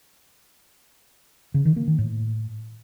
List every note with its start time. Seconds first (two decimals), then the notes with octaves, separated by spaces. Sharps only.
1.54 C#3
1.65 D#3
1.76 A#3
1.87 D#3
1.98 A2